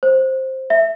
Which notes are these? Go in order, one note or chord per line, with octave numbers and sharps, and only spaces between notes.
C5
E5